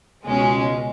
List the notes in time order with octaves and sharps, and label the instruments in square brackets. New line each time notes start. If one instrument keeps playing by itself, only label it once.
[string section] C#2 B2 G#3 C#4